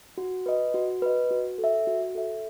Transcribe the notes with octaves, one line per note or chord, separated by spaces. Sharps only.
F#4
B4 D#5
F#4
B4 D#5
F#4
A4
E5
F#4
A4 E5